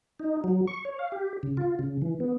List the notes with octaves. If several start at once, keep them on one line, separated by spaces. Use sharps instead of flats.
D#4
F#3
C#6
C#5
F5
G4
C#3
F4
C#3
E3
B3